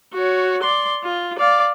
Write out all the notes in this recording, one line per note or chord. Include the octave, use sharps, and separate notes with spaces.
F#4 C#5
D5 C6
F4
D5 F5